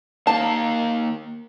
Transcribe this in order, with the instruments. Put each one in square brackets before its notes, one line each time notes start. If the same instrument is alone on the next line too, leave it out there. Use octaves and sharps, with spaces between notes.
[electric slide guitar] A#3 D#4 F5 [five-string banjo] A5